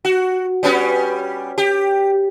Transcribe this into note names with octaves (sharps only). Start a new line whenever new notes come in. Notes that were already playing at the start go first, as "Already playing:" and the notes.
F#4
G3 B3 C#4
G4